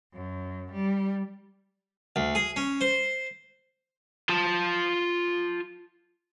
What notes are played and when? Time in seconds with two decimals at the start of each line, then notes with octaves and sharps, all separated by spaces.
0.13 F#2
0.71 G3
2.16 D2
2.35 G#4
2.56 C#4
2.81 C5
4.29 F4 A5